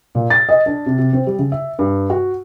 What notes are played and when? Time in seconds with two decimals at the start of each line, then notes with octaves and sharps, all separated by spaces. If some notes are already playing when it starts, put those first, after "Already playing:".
0.15 A#2
0.30 A6
0.49 D#5
0.66 D4
0.86 C3
0.98 C3
1.13 C4
1.27 G3
1.39 C#3
1.52 E5
1.79 G2
2.10 F#4